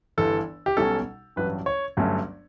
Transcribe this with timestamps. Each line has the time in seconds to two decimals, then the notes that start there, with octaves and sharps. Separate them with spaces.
0.18 G1 G2 E3 A4
0.66 G4
0.77 B1 B2 G3 C#4 A4
1.36 A1 G2 F#3 B4
1.66 C#5
1.97 G1 G2 F#3 A3 C#4